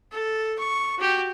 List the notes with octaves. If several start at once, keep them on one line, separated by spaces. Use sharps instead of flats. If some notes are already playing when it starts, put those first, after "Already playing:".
A4
C#6
F#4 G4